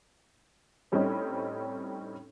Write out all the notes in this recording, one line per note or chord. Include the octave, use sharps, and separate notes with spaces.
A2 G3 C4 C#4 D#4